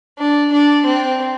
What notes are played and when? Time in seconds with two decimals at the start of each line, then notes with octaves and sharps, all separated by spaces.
0.19 D4
0.53 D4
0.86 C4